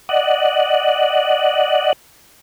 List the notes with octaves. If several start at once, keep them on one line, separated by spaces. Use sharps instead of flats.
D5 D#5 F#5